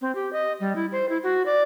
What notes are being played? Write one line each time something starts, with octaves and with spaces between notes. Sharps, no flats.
C4
G4
D#5
G3
E4
C5
E4
F#4
D5